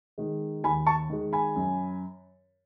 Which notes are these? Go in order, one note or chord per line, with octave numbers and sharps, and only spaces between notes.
D#3 G#3
D#2 G#5 B5
A5 C#6
D#3 G#3
G#5 B5
F#2